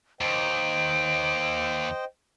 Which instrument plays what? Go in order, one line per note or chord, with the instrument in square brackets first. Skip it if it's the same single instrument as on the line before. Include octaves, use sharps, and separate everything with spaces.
[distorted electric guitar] D#2 [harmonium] C5 D#5 G5 [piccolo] D7